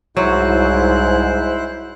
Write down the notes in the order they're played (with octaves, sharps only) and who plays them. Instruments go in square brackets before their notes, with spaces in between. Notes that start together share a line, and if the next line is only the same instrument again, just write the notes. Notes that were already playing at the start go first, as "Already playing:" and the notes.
[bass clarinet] C2 [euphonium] G#2 [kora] F#3 [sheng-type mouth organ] E4 C5 F#6